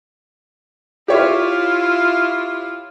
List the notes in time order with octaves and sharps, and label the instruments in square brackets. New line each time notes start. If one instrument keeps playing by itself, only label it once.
[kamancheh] E4 F4 [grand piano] G4 C#5 E5